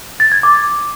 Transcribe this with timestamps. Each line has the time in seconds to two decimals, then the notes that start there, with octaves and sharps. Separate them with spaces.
0.20 A6
0.32 G#6
0.43 D6